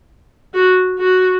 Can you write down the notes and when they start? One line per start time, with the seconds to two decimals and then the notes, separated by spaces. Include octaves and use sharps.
0.53 F#4
0.98 F#4